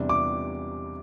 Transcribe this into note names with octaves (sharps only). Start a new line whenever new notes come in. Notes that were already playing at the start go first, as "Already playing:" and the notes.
Already playing: E2 C3 G3 D4
D6